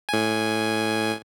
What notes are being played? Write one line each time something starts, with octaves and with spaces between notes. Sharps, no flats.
A2 G#5